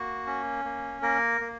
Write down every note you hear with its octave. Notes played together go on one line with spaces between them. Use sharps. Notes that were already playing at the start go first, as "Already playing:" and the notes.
Already playing: A#3 F#4
C#4
A#3
A#3 A#4
A#3